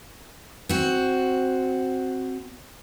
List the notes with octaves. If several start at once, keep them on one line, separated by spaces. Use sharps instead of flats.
C4 F#4